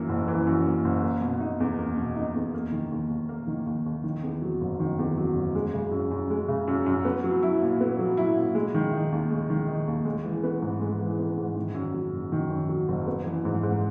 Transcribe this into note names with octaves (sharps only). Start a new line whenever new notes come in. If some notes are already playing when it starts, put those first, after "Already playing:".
Already playing: F#2 E3 A#3
F#1
E3
F#2
A#3
F#1
A#3
B2
D#4
E2
A#3
B2
D#4
E2
A#3
D#3
D#2
D#2
A#3
D#3
D#2
D#2
D#3
E2
F#3
F#1
D#3
E2
F#3
F#1
G#3
C#3
F#2
F#2
G#3
C#3
F#2
F#2
B3
F#3
E4
A#2
B3
F#3
E4
A#2
G#3
D#3
D#4
D#2
G#3
D#3
D#4
D#2
G#3
E3
B3
G#2
G#3
E3
B3
G#2
D#3
F#2
F#3
F#1
D#3
F#2
F#3
F#1
B3
E3
G#2
G#2